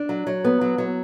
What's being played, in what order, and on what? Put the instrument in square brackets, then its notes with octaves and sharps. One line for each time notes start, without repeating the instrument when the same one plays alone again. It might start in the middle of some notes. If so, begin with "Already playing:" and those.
Already playing: [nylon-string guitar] D4
F#3
F#3
B3
F#3
F#3